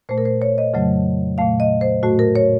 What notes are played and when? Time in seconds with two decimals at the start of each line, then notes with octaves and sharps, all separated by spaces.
0.09 A#2 A3 C5
0.18 A#4
0.26 C5
0.42 C#5
0.58 D#5
0.74 F2 C#3 F#3 A3
1.38 A#2 A3 F5
1.60 D#5
1.81 C5
2.03 A2 A3 F#4
2.19 A#4
2.36 C#5